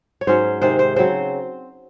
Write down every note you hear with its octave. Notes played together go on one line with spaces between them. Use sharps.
C#5
G#2 F#3 C#4 C5
C3 D#3 G#3 C5
C5
C#3 F#3 C4 C5